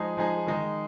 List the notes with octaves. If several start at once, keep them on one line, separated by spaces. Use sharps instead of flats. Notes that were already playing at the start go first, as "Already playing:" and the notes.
Already playing: F3 G#3 D#4 G#4
F3 G#3 D#4 G#4
D#3 G#3 D#4